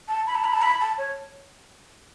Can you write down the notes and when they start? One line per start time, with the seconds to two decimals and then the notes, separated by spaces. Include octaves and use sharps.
0.08 A5
0.27 B5
0.35 A5
0.44 B5
0.53 A5
0.62 B5
0.81 A5
0.98 C#5